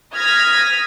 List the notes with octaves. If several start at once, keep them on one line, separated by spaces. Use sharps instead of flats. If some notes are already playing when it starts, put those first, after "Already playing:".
D#6 F6 G#6 A#6 B6